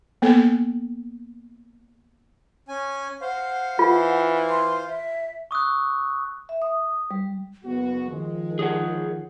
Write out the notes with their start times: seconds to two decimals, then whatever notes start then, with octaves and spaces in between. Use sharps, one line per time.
0.22 A#3 B3 A4
2.69 C#4 G#5
3.21 C5 F5 F#5
3.79 E3 F4
4.49 C6
4.87 E5
5.51 C#6 D#6 E6 F#6
6.49 E5
6.62 D#6
7.11 G3
7.65 F#1 B3 F#4
8.11 D#3 F3 G#3
8.59 G#4 C#5 F#5